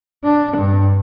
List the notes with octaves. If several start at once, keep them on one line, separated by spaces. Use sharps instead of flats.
D4
G2